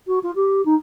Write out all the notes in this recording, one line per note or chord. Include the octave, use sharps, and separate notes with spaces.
F#4
F4
G4
D#4